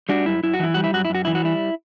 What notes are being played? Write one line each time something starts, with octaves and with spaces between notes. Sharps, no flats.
G3 D4 F#4
F#2 E4
F#2 E4
F#4
E3 E4
G3 F#4
E4
F#2 F#4
E4
F#2 F#4
E3 E4
F#4
G3 E4